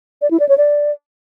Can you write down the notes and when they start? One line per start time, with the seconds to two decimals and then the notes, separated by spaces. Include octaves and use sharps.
0.22 D5
0.31 E4
0.40 D5
0.49 C#5
0.58 D5